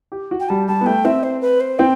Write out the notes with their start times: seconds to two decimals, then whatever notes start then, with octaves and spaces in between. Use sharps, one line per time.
0.12 G4
0.31 F#4
0.40 G5
0.49 G3 A5
0.68 G3 A5
0.81 B3
0.86 A3 G5
1.05 C4 E5
1.23 C5
1.41 B4
1.60 C5
1.79 C4 G5